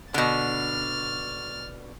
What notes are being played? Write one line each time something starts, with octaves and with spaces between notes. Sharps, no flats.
B2 D3 F6 A6